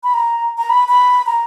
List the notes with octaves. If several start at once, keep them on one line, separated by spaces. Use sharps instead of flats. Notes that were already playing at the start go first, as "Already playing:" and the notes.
B5
A#5
A#5
B5
B5
A#5